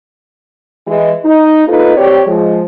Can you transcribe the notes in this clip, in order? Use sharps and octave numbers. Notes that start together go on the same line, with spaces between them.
E3 G#3
D#4
A#3 D#4 F4 A4 B4
C4 G4 C#5 D5
F3 G#3